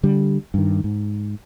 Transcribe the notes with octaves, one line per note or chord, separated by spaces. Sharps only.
D3 G3
G2 D#3
G#2